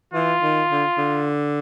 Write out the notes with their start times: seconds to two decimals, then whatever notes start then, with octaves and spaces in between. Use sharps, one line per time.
0.14 E3 F4
0.42 D#3
0.72 D3
0.98 D3